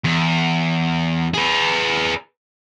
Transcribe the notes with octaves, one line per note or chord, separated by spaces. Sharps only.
E2
G#4 B4